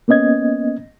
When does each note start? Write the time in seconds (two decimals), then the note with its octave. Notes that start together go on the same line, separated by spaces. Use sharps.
0.08 A#3 B3 C#4 D#5 G#6